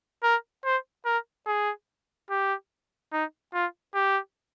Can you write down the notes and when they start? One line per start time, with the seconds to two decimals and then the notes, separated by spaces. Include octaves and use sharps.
0.23 A#4
0.64 C5
1.05 A#4
1.47 G#4
2.30 G4
3.12 D#4
3.54 F4
3.94 G4